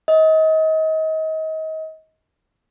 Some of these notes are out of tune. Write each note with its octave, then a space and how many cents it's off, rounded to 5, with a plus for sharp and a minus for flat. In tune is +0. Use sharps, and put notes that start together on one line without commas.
D#5 +30